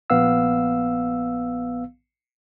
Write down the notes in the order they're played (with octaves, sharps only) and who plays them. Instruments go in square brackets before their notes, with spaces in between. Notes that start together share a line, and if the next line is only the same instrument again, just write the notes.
[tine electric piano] A#1 B3 F5 E6